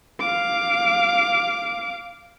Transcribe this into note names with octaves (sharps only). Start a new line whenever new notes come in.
F5 D6